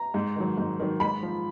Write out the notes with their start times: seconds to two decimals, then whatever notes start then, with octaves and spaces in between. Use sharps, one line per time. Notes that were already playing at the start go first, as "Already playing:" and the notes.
Already playing: A#5
0.14 G#2
0.36 D#3 F#3
0.57 G#2
0.80 D#3 F#3
1.00 G#2 B5
1.23 F3